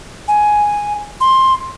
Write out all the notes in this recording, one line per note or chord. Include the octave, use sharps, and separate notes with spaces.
G#5
C6